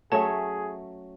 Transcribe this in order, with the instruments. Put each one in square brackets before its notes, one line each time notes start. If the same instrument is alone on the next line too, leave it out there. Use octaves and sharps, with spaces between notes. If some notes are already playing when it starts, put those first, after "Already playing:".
[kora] F#3 A3 C#4 [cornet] G#4 [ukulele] C#5 E5 [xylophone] A5